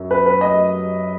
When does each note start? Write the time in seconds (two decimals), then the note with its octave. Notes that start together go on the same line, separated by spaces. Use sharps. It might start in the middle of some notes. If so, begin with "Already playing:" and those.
Already playing: F#2
0.11 B4
0.26 B4
0.41 D#5